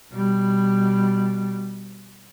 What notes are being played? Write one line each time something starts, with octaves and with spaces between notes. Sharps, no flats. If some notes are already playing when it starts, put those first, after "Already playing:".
B2 G3